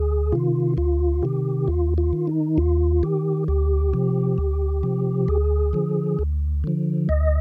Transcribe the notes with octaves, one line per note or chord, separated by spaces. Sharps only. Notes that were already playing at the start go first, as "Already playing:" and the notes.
Already playing: D2 G#4
C3 D#3 F4
D2 F4
C3 D#3 G4
D#2 F4
F4
D#3
D#4
D#2 F4
D#3 G4
D2 G4
C3 F3
D2
C3 F3
D2 G#4
D3 F3
D2
D3 F3
D2 D#5